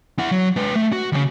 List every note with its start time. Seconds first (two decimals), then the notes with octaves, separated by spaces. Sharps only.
0.19 E4 F#5
0.31 F#3
0.56 G#3 B4
0.75 A3
0.92 F#4
1.12 D#2 C#3